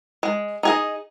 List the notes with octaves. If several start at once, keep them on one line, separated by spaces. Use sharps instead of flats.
G#3
D#4 G#4 D#5